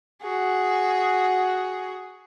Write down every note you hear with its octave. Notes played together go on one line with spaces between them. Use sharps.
F#4 G#4